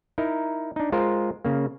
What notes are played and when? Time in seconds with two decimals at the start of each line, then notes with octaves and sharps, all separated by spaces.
0.18 D#4 E4 A#4
0.76 D4 D#4
0.92 G#3 F4 A#4 C5
1.45 C#3 A#3